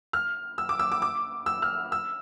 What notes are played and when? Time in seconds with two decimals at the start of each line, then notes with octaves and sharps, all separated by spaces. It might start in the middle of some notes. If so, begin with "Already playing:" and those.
0.13 F6
0.58 E6
0.69 D6
0.79 E6
0.92 D6
1.02 D6
1.46 E6
1.62 F6
1.92 E6